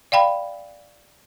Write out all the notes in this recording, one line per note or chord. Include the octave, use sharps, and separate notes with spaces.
D5 F5 G5 B5